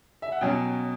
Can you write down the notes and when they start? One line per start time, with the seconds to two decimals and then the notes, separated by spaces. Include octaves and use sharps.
0.22 E5
0.32 F#5
0.41 B2 F#3 C#4 G5